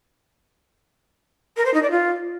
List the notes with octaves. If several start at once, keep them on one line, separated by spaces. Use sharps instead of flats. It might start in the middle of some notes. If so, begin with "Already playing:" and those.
A#4
C5
D#4
D5
F4